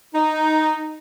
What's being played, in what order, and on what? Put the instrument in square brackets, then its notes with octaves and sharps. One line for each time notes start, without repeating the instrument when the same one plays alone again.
[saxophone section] D#4